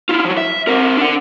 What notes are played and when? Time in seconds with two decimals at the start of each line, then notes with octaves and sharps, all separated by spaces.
0.09 E4 F4
0.25 F3 F#3
0.37 E5
0.67 C4 A#4
0.97 D4 F#5